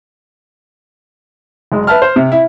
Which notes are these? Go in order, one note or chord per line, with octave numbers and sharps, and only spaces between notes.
F#1 G#3
B4 E5 A5 F6
C5
C3
E4